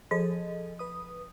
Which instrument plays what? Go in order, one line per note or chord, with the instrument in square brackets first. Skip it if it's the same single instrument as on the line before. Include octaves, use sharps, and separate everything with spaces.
[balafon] F3 [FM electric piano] G#4 A4 D#5
[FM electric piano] B4 D#6